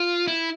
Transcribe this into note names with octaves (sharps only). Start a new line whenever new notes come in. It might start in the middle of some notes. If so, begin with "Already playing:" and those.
Already playing: F4
E4